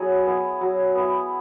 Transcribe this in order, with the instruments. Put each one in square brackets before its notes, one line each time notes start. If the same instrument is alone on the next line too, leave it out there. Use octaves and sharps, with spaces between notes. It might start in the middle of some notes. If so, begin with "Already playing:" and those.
Already playing: [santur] F#3 B3 E4 G#4
B3 E4
F#3
B3 E4